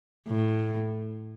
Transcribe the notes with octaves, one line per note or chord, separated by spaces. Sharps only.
A2